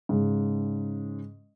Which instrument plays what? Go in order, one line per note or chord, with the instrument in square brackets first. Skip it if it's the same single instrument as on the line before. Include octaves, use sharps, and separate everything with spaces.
[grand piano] G#2 C#3 G#3